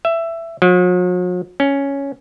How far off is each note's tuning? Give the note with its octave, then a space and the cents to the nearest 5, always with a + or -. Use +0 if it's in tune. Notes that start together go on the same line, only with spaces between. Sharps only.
E5 +15
F#3 -45
C#4 +5